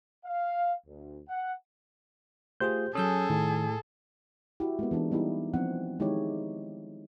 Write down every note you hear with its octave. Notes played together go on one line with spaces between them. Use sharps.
F5
D2
F#5
A3 F4 G4 G#4 C5 G6
F#3 C#4 G#4 A4 D#6 E6 G6
A2 D#3
E4 F#4 G4
G#3 A#3 B3
E3 B3 D4 D#4
G3 B3 D#4 E4 G4
F3 B3 C4 F#5
D#3 G#3 D#4 E4 G4 C#5